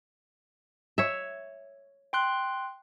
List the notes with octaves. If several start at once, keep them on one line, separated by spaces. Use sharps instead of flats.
C#5 E5
G5 C6 F#6